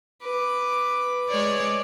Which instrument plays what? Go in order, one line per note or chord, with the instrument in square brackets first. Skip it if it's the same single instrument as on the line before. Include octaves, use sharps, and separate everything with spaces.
[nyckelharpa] B4 D6
[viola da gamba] G#3 C#5 D5